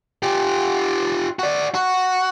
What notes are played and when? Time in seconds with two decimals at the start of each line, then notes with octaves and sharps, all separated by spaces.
0.23 F4 G4
1.39 F#4 D5
1.75 F#4